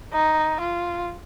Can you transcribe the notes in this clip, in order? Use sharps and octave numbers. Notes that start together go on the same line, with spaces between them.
D#4
F4